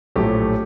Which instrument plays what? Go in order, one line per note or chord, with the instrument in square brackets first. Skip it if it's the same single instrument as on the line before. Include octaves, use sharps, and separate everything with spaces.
[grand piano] A#1 A2 F#3 A3 G4